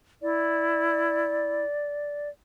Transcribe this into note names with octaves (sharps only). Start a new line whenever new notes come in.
E4 D5